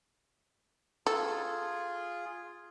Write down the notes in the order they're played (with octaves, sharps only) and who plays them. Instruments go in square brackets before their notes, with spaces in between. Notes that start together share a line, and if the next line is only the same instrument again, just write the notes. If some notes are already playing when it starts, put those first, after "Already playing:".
[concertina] F4 G#4 [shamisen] A4